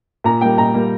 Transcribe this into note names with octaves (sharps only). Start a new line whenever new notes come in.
A#2 A#5
G3 A#3 G5
A#2 A#5
G3 A#3